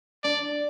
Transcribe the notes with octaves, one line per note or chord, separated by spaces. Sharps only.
D4 D5